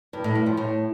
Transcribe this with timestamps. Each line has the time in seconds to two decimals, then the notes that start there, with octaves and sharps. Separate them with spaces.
0.13 G2
0.24 A2
0.35 G2
0.46 F3
0.57 A2